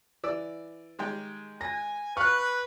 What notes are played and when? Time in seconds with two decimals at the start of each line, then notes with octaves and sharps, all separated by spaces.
0.24 E3 D5 E6
0.99 D#3 G#3 G4
1.61 G#5 A#6
2.17 B4 F5 C#6 F#6